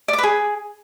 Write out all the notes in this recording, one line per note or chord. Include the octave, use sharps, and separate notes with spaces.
D5
D6
B4
G#4